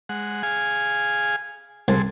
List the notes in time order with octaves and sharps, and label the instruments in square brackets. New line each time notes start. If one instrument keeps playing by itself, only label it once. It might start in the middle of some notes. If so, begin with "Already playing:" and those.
[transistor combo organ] G#3 F#5
G#4 F5 G#5
[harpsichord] C2 [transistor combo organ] C4 G#4 A4